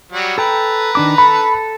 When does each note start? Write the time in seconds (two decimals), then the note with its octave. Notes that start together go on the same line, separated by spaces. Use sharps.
0.12 F#3 G3 F#5
0.38 A4 B4 G5 A#5
0.95 D#3 D4 D6
1.18 A4 B5